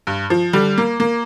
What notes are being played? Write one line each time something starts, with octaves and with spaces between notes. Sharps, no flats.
G2
F3
D3 G3
A#3
A#3